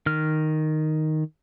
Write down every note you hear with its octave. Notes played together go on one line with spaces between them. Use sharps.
D#3 F6